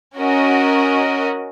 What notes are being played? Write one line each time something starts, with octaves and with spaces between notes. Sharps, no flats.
C#4 F#4 A#4 D#5